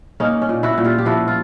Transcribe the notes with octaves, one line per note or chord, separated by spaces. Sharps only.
A#3 C#4 D#4
C#4
A#2
E4 F#4
A#2
F4 G4
G4
F3 E4 F#4
F4